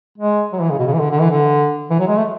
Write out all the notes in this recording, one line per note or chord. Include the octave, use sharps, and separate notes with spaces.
G#3
F#3
E3
C#3
B2
C#3
E3
D3
D3
E3
D3
E3
F#3
G#3
A3